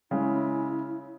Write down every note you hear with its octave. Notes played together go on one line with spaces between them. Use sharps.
C#3 G#3 C#4 E4